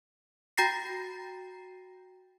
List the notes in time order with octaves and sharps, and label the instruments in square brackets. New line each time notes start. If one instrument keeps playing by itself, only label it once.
[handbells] F#4 G5 A#5 A6 A#6 C7